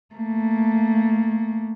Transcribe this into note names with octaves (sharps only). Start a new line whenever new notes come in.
A3 A#3